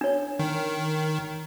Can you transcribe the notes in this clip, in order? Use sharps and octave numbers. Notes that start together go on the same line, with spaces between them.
D4 C#5
D#3